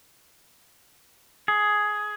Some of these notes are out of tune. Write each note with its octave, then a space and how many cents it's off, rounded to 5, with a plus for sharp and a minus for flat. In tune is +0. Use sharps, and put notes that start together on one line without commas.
G#4 +10